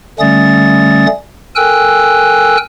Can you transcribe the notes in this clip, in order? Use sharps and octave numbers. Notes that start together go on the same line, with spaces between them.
D3 G3 A3 C#4 D#6 A6
A4 A#4 G5 G#5 E6 F#6